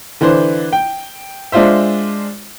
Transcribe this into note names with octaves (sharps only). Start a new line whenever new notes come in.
D3 E3 D4 C5
G5
G#3 D4 F4 C5 E5